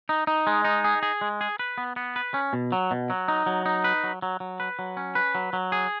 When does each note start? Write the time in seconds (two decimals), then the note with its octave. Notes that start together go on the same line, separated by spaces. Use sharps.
0.09 D#4
0.27 D#4
0.47 G#3
0.65 D#4
0.84 G#4
1.03 G#4
1.21 G#3
1.41 G#4
1.59 B4
1.78 B3
1.96 B3
2.16 B4
2.34 C#4
2.53 B2
2.72 F#3
2.91 B2
3.10 F#3
3.28 D#4
3.46 F#3
3.66 D#4
3.84 B4
4.04 F#3
4.22 F#3
4.40 F#3
4.60 B4
4.79 F#3
4.97 C#4
5.15 B4
5.35 F#3
5.53 F#3
5.72 G#4